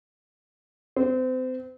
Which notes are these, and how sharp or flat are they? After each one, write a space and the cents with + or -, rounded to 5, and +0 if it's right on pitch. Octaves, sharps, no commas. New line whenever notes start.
C4 -35